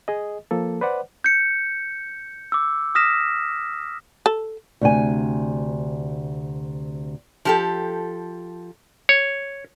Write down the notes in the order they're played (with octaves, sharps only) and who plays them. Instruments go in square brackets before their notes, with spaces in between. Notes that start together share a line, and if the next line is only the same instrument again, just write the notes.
[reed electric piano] G#4 D#5
F3 A#3 A4
B4 C5 D5 F#5
[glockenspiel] G6 C#7
D6 E6
D#6 F6 A#6 B6 E7
[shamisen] A4
[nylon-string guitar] D2 C3 G#5
[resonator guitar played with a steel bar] F3 G4 A4
[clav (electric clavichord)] C#5